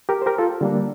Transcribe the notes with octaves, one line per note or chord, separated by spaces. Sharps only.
G4 A#4
C5
G4 A#4
F4 A4
D3 G3 A#3 D4